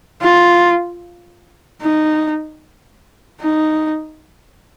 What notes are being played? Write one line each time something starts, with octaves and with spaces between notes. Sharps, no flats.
F4
D#4
D#4